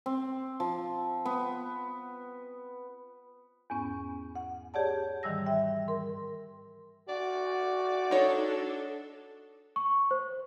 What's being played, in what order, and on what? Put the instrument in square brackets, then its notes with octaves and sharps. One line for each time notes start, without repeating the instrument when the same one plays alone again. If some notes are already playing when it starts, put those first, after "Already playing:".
[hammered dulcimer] C4
F3
B3
[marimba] E2 G#2 B3 C#4
F#5
G4 G#4 C#5 D5 F#5 A5
G#2 D#3 E3 G3 E6 A#6
G#2 E5 G5
A#4 C6
[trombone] F#4 [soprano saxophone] D5
[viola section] D4 A4 [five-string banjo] D#4 C#5
[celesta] C#6
C5